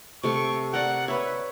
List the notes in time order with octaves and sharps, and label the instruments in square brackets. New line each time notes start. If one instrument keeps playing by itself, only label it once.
[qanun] C3 A3 [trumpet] C#6
[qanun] A#4 D5 [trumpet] F#5
[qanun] B4 C#5 [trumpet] E5